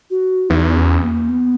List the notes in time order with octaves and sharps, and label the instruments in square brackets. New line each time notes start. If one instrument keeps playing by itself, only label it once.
[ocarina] F#4
[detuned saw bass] E2 [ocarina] D#4
[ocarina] C#4
A#3
B3